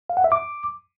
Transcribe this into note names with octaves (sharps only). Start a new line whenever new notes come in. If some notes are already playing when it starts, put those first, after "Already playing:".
F5
F#5
E5
D6